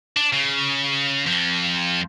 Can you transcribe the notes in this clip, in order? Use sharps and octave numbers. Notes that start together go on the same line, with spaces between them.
D4
C#3
F2 F3